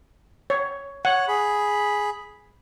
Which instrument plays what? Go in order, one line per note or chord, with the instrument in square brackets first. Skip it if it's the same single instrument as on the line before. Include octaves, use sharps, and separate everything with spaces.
[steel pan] C#5
[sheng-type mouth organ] C#5 [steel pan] F#5
[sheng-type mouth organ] G#4 B5